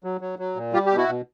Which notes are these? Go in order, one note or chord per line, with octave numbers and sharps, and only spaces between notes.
F#3
F#3
F#3
A#2
G3 F4 G4
G4
B2
E4 F#4
B2